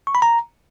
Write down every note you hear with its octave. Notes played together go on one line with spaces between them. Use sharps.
C#6
B5
A#5